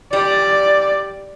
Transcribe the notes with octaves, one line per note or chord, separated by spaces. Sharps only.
G3 D5